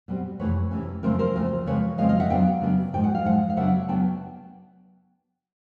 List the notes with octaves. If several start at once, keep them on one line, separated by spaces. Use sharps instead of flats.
B2 G3 C4
F2 C3 E3 A3 B4 C#5
F2 C3 E3 A3 C#4
D2 C#3 F3 A3 C4 A#4 C5
A#4 C5
D2 C#3 F3 A3 C4
C#3 F3 G#3 C4 B4 C#5
C#3 F3 G#3 C4 D#5 F5
D#5 F5
E5 F#5
C#3 F#3 B3 D4 F5 G5
C#3 F#3 B3 D4
G#2 F3 G#3 G5
F#5
F5
G#2 F3 G#3 F#5
F5
C#3 F#3 B3 D4 E5 F#5
C#3 F#3 B3 D4 G5 A5